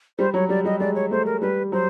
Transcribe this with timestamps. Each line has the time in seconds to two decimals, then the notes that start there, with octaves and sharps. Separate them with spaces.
0.19 G3 C5
0.34 F#3 C#5
0.49 G3 D5
0.65 G3 D#5
0.79 G#3 D5
0.95 C#5
1.11 A3 C5
1.26 A#4
1.41 G3 B4
1.72 F#3 C5